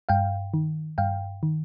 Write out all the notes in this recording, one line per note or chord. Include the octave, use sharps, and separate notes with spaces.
G2 F5 G5
D#3
G2 F5 G5
D#3